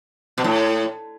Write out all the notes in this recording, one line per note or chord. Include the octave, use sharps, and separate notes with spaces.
B2
A2